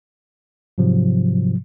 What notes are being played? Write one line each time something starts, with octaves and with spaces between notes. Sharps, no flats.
G#2 C3 F3 F#3